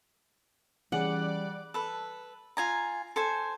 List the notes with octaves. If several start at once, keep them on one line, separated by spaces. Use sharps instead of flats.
E3 G3 C#4 G#4 D5 F#5
A4 B4
F4 G#5 A#5
A4 C5 G#5